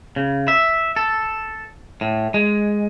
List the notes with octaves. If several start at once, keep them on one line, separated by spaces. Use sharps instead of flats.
C#3
E5
A4
A2
G#3